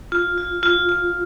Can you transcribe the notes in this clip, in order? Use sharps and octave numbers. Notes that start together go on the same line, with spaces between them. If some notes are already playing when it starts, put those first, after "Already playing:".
F4
F4
F4
F4